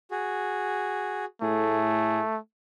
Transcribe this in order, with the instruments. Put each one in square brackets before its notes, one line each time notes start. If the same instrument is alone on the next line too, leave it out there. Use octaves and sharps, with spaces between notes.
[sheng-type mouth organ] F#4 G#4
[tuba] A2 [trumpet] A3 [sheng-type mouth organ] G#4